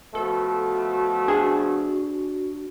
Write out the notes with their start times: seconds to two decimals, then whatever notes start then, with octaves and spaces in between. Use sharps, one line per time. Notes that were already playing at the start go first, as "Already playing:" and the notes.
0.15 B2 F3 A3 F#4 A4
1.28 D4 G#4